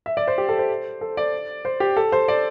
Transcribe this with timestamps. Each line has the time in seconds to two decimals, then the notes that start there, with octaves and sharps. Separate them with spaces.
0.06 E5
0.17 D5
0.28 C5
0.38 G4
0.49 A4
0.59 C5
1.01 A4
1.17 D5
1.65 C5
1.80 G4
1.97 A4
2.12 C5
2.28 D5